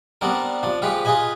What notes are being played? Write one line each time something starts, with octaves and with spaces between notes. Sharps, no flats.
G3 B3 C4 D4 A#4
F3 D4
F3 G#3 G4 B4 F5
F4 G#4 B4 D#5 G#5 B5